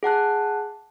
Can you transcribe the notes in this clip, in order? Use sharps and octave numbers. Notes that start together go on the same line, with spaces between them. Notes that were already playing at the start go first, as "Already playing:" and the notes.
G#4 F#5 A5 F#6